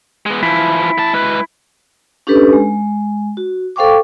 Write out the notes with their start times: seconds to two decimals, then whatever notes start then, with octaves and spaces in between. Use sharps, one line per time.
0.26 G#3 B3
0.43 E3 F3 E4
0.98 E3 A5
1.13 G#3 B4
2.27 C#4 D4 G4 A4 B4
2.53 G#3
3.37 F#4
3.76 A4 C5 F5 G5 C#6 D6